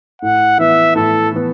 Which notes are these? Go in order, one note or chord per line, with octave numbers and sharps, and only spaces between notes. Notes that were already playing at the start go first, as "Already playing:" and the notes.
A2 F#5
E3 B3 E5
A2 A4
E3 B3